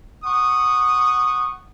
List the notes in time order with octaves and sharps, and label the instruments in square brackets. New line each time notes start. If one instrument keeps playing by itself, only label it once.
[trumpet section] F#5 C#6 D#6